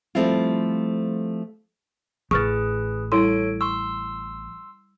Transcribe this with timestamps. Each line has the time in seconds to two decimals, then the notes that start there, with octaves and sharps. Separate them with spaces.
0.15 F3 G3 A3 C4 E4 F4
2.31 A1 G#4 B4 C#6 F6 A6
3.12 G3 E4 A4 C#5 C6 D7
3.61 C6 C#6 E6